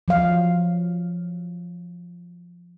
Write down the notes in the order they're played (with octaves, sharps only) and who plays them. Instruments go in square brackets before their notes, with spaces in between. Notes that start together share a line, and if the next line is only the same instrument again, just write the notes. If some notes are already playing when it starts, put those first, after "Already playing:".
[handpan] F3 F#3 F5